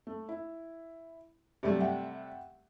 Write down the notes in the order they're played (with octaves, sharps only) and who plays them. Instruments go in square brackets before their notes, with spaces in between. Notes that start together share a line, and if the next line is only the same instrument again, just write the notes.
[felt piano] A3
E4
[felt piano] G2 F#3 [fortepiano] C3 G3 A3
[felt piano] E5 F#5 G5